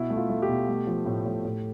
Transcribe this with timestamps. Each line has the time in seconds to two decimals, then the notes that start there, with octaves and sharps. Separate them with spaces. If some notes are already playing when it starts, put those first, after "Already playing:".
Already playing: B2 E4
0.10 A3
0.17 F4
0.30 A3
0.42 G4
0.49 B2
0.68 A3
0.87 F3
1.06 A2
1.25 A2
1.45 A2